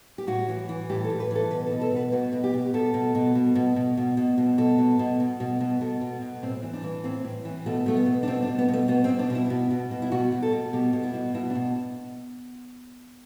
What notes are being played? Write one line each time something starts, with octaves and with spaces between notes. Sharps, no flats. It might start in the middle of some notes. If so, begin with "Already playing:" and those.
G4
A2 F#4
E3
E3
A2 G4
A4
A2
B4
E3 A4
B2 B4
A4
B2
A4
B2 B4
B2 F#4
B2
G4
B2
B2 A4
B2
B2
B2
B2
B2
B2
B2
B2
B2 A4
B2
B2
B2
B2
B2
B2 A4
B2
B2
A2 C4
E3
D4
E3
A2 C4
A2
E3
B2 A3
B2 A3
B3
B2
D4
B2 C4
D4
B2
B3
B2
A3
B2 B3
C4
B2
D4
B2
E4
B2
B2
B2
E4
B2 F#4
B2
A4
B2
B2 G4
B2
E4
B2
B2 E4
D4
B2